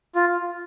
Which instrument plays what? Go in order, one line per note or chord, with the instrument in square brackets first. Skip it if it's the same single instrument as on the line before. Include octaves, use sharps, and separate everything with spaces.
[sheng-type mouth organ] F4